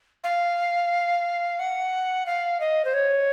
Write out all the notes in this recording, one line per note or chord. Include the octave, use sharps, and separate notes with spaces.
F5
F#5
F5
D#5
C5
C#5